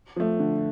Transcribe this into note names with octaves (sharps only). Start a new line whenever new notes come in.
F3 A3
D3